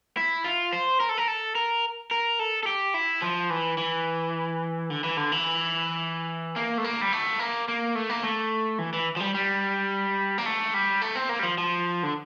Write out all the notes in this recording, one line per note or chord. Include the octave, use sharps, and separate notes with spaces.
E4
F4
C5
A#4
A4
A#4
A4
A#4
A#4
A4
A4
G4
E4
F3
E3
E3
D3
E3
D3
E3
A#3
A3
A#3
G3
A3
A#3
A#3
A3
A#3
A3
E3
E3
F3
G3
G3
A#3
A3
G3
A3
C4
A#3
G3
F3
F3
D3